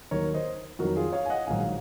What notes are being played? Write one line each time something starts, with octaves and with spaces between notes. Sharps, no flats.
D#2 D#3 F#3 A#4 C#5
C5 D#5
F2 D#3 F#3 F#4 A#4
F4 G#4
C#5 F5
G#5
D#5 F#5
A#1 G#2 D#3 F#3 F5 G#5